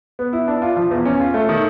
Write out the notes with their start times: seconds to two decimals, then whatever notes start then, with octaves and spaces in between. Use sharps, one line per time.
0.19 B3
0.33 E4
0.48 D4
0.62 F4
0.77 F3
0.91 E2
1.05 C#4
1.20 F4
1.34 A3
1.49 D#3